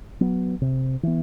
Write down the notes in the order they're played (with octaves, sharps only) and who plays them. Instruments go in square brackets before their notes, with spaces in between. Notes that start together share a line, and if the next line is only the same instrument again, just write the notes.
[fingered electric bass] F#3 B3
C3
E3 B3